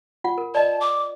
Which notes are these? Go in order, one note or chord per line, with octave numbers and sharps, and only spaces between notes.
F4 F#5
A#4
D5 D#5 A5
D6